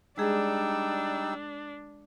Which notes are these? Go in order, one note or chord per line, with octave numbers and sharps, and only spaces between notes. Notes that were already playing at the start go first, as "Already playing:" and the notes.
G3 G#3 D4 D#4 G#4 E6